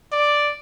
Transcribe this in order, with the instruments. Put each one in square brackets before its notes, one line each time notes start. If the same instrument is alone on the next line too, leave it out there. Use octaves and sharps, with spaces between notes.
[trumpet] D5